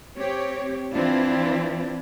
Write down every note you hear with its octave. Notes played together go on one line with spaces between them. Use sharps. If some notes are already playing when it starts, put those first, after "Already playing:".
C4 G4 C#5
E3 C4 D4 E4 F4